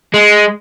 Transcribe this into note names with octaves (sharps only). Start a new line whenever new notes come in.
G#3